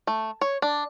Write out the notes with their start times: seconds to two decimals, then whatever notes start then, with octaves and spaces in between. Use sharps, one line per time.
0.07 A3
0.41 C#5
0.62 D4